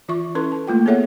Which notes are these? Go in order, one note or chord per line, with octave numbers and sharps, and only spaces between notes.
E3 F4 E5 C#6
C#4 E4 A4 B4 C6
A5
A3 A#3 F4 G5
B3 G#4 A4 C#5 E5 F#5